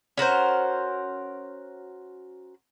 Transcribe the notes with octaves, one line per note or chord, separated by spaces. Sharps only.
C#4 F#4 A#4 C5